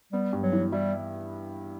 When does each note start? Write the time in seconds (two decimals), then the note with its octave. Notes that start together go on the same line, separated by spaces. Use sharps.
0.13 G3 B3
0.33 G2
0.43 F#3
0.53 E3
0.72 G3 E4